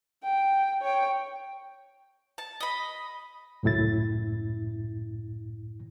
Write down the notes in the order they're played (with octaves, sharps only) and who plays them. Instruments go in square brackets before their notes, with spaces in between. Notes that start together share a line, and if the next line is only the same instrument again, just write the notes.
[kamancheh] G5
C#5 G5
[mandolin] A5
D#5 B5
[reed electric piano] C#2 F#2 A2 E4 A6